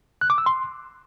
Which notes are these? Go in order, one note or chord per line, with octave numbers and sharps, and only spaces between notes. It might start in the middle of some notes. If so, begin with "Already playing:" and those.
F#6
D6
E6
C6